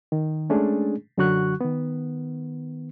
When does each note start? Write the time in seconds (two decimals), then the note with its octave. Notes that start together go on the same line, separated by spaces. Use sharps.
0.12 D#3
0.50 G#3 A3 C#4 D4 G#4
1.18 F#2 D3 F#3 F#4 C#6 F#6
1.61 D#3 B3